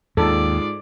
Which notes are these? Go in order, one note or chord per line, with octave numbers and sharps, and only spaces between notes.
D#2 G#2 F4 A4 D5